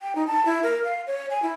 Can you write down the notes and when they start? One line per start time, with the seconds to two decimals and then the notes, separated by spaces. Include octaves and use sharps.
0.01 G5
0.15 D#4
0.27 A5
0.46 E4
0.63 A#4
0.84 F5
1.07 C#5
1.30 G#5
1.42 E4